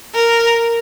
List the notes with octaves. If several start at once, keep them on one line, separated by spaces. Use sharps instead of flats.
A#4